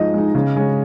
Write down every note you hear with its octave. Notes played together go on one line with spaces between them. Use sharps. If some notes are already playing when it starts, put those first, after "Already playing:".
Already playing: F3 G#3 D#4 D#5
G#3 D#4
C#3
G#3 C#4